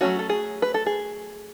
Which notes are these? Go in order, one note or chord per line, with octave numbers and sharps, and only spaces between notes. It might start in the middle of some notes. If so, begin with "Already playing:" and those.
F#3 A3 C#4 F#4
A4
G#4
B4
A4
G#4